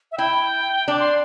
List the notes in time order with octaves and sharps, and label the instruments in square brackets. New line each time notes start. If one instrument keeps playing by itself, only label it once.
[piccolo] E5
[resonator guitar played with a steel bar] E4 [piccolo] G5
[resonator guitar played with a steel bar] D4 [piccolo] D6
[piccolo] C6